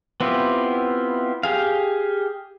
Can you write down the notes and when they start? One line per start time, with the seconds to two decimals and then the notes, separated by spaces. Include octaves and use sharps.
0.21 B3 C4 E4 F4 G4
1.43 G4 G#4 F5